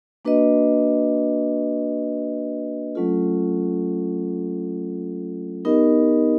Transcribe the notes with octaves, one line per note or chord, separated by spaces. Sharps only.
A#3 D4 F#4 B4 D#5
F#3 A3 C#4 F4 A4
B3 D#4 G4 A#4 D#5